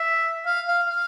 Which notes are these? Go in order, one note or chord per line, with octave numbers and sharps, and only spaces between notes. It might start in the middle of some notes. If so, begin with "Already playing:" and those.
Already playing: E5
F5
F5
F5